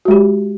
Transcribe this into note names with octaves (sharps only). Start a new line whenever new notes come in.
G#3 F#4 G4